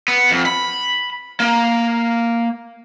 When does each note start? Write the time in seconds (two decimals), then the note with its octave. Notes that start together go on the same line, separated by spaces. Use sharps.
0.08 B3
0.31 F2
0.46 B5
1.40 A#3